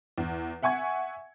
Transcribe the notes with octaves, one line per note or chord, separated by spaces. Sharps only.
E2
E5 F#5 G#5 C#6 G#6